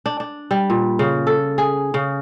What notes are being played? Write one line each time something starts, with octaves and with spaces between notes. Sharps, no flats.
D4
D4
G3
A#2
C#3
A4
G#4
C#3